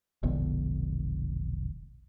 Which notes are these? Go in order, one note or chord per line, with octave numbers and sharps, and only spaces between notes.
E1 A#1 D3 B3